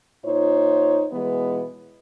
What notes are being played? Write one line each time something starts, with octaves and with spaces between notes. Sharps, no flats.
A#2 D#4 F4 C5 C#5
B2 E3 G#3 B3